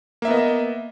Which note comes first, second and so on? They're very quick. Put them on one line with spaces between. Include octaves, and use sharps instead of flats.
A#3 E5 B3 D#5